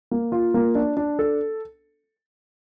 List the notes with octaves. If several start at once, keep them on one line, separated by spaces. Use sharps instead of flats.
A#3
F4
A#3
D4
D4
A4